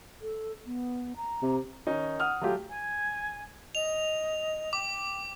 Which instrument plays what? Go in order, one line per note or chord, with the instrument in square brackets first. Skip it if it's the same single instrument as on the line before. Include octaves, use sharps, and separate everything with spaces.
[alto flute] A4
B3
A#5
[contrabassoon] C3
[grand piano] D#3 C#4 D#4
F#5 D#6 F6
F#3 A3 F4 G4
[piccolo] G#5
[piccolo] D#5 [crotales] F7
[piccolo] G5 [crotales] D6